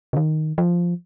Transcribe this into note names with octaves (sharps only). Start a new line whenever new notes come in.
C#3
D#3
F3